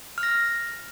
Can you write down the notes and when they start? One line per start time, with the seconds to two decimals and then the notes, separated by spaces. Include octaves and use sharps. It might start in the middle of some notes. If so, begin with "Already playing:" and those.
0.18 F6
0.23 A#6
0.28 F6